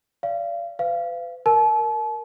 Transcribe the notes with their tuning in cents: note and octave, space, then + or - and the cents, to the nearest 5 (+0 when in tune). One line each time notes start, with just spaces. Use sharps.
D5 -20 F5 -35
B4 +40 F5 -30
A#4 +0 A5 -40